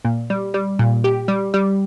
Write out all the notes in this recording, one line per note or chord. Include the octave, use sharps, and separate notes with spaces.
A#2
G3
G3
A#2
G4
G3
G3